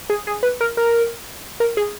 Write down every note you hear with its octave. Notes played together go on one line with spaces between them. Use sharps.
G#4
G#4
B4
A#4
A#4
A#4
G#4